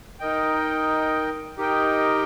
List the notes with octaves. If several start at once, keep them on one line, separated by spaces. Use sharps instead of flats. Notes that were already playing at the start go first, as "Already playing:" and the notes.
D#4 A#4 D#5 G5
D#4 G4 A#4 D#5 G5